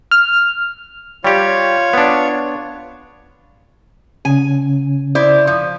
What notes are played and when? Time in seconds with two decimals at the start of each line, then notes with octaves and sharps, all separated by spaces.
0.11 F6
1.24 G3 F4 G4 C#5
1.93 B3 D4
4.25 C#3 C#4 G#5
5.15 E4 C5 D5
5.47 F3